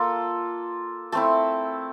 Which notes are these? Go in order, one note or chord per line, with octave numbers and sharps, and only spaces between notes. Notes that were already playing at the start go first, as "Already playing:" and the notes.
Already playing: A#3 F4 A4
A3 C4 E4 A4